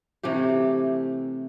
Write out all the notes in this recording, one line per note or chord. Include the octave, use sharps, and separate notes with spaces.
C3 E3 A3 G4